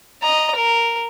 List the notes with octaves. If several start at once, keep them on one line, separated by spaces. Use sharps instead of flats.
D#5 A#5
A#4